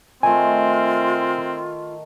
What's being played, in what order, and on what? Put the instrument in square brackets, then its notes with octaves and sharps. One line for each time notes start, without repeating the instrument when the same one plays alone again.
[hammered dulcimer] D#3 A3 [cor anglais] C4 [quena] F4 [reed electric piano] G#5